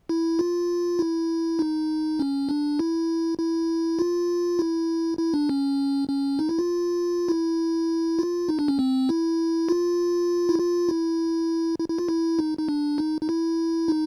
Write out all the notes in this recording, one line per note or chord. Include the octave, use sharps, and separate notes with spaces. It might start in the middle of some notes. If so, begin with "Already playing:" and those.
E4
F4
E4
D#4
C#4
D4
E4
E4
F4
E4
E4
D4
C#4
C#4
D#4
E4
F4
E4
F4
D#4
D4
C#4
C4
E4
F4
E4
F4
E4
E4
E4
F4
E4
D#4
D#4
D4
D#4
D#4
E4
D#4